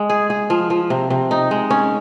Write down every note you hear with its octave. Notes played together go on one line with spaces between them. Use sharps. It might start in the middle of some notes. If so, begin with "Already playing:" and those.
Already playing: G#3
G#4
G#4
F3
F3
C3
C3
D#4
G#3
C#4